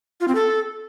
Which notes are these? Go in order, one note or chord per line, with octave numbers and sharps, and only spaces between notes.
F4
C4
A4